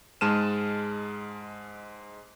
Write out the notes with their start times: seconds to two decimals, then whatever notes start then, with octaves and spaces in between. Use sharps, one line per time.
0.21 G#2 G#3 A5 F6 D#7 E7